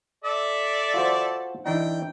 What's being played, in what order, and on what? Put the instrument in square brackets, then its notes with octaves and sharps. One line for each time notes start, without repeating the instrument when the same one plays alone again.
[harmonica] A4 D5 E5
[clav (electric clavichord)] F4 F#4 C5
[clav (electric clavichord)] E3 D4 D#4 [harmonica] G5